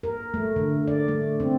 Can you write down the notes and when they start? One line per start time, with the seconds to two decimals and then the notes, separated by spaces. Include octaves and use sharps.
0.03 A#4
0.34 A3
0.56 D3
0.88 D5
1.08 A3
1.40 C4